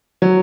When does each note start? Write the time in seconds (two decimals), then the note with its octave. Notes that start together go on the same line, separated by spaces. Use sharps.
0.22 F#3